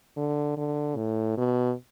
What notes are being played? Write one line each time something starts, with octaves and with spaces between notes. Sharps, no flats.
D3
D3
A2
B2